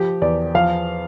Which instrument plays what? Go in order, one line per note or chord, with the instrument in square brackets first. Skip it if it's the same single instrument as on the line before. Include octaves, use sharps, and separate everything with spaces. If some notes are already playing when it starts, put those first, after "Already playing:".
Already playing: [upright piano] F3 G4
E2 D5
F3 F5